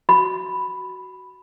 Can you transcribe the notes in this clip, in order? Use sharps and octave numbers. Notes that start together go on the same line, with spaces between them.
F#4 B5